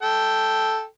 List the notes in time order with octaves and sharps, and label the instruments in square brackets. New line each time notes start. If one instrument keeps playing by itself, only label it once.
[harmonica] A4 G5